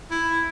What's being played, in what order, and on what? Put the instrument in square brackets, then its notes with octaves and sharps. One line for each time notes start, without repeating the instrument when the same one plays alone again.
[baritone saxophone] E4